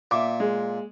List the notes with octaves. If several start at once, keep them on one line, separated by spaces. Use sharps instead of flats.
A#2 E5 D6
G#3